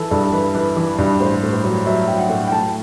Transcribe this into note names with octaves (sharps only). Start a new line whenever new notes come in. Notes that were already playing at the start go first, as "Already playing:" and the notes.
Already playing: E3 A4
G2 A4
E3 B4
E3 B4
E3
G2
A2 C5
A2
C5
F#3
F#3 E5
F#3 G5
F#5
A2
G5
A2 A5